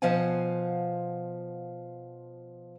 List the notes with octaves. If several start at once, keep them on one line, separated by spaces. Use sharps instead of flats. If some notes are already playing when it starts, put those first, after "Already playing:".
B2 F3 C5 F5 F#5 G#5